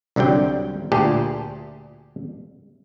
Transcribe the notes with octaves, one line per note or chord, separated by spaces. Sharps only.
C2 D3 F#3 G3 G5
D2 A#2 G4 G#4 G5 A5